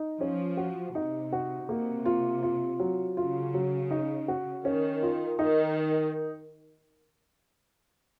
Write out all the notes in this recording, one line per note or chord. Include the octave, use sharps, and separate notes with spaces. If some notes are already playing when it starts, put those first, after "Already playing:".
Already playing: D#4
F3 C#4
F#4
C3 D#4
F#4
C3 A#3
F4
F4
F#3
C#3 F4
F#3
D#4
F#4
D#3 C#4
F4
D#3 D#4